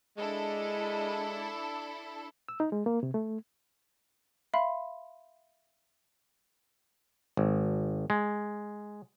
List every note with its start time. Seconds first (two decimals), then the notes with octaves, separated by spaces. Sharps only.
0.17 G#3 D4 E4 A4
2.49 E6
2.60 D#4
2.72 G#3
2.86 A#3
3.03 C3
3.14 A3
4.54 E5 F5 B5 C6
7.37 G#1
8.10 G#3